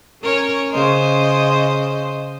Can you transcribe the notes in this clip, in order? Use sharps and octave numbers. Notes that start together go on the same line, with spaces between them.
C#4 A#4 C#5
C#3 C5 D#5